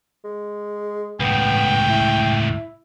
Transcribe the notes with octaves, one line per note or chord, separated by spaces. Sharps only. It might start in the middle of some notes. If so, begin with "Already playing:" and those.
G#3
C#2 A2 B3 G5
E4